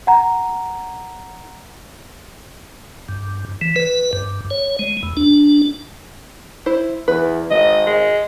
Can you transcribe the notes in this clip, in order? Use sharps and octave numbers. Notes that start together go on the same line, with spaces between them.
F#5 A#5
G2
E3
B4
G2
C#5
G#3
E2
D4
E4 C5
E2 B4
G#1 D#5
G#3